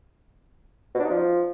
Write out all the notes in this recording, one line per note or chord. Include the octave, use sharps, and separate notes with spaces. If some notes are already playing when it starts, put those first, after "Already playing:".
B2
D4
D#4
F3